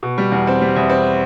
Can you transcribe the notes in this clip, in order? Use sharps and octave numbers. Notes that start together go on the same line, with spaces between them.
B2
G3
E2
C4
G3
E2
C4